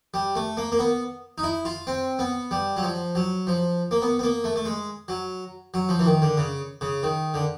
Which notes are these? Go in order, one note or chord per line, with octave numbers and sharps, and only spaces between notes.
G3
A3
A#3
A#3
B3
D#4
E4
F4
C4
B3
G3
F#3
F3
F#3
F3
A#3
B3
B3
A#3
A3
A3
G#3
F#3
F#3
F3
E3
D#3
D3
C#3
C#3
D#3
D3